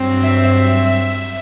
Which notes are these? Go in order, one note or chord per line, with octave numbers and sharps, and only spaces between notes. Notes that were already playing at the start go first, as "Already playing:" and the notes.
Already playing: G2 F#3 C4
E5
E5